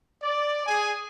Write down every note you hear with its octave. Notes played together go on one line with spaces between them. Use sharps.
D5
G#4 G#5